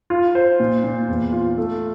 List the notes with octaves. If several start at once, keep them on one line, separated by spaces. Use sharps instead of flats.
F4
C5
A#2
A#2
E2
F4
A3